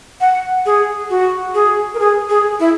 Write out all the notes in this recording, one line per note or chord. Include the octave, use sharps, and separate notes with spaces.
F#5
G#4
F#4
G#4
A#4
G#4
G#4
E4